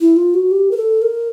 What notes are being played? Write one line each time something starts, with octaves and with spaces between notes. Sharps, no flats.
E4
F4
F#4
G4
A#4
A4
A#4